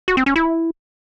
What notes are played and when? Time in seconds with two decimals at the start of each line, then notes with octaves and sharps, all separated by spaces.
0.08 F#4
0.17 C4
0.26 C#4
0.36 E4